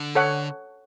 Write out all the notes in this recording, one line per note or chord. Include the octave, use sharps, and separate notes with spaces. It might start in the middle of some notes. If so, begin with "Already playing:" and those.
Already playing: D3
A4 C#5 F#5